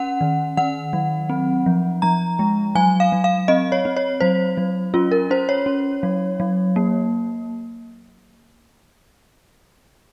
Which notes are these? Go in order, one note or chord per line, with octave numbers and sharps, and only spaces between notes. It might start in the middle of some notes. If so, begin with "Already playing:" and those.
Already playing: C#4 F#5
D#3
D#3 F#5
F#3
C4
F3
F3 A#5
G#3
F#3 G#5
F5
F#3
F5
C4 D#5
C#5
C4
C#5
F#3 C5
F#3
C#4 F4
A#4
C#4 C5
C#5
C#4
F#3
F#3
A#3